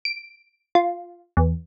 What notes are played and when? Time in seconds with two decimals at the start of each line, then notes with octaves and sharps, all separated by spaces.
0.05 D7
0.75 F4
1.37 E2